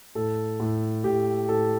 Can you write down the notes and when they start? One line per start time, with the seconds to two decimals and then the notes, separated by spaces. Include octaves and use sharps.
0.15 A2 A4
0.60 A2
1.04 A2 G4
1.49 A2 A4